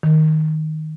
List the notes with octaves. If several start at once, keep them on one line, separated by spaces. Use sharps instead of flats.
D#3